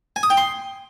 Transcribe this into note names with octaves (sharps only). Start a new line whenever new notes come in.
G#5
D#6
G5
C6